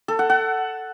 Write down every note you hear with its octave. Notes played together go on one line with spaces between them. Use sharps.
A4
F#5
F#5